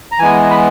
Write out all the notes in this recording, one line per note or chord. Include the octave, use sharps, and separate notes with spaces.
A#5
E3 G#3 B3 G#5
B5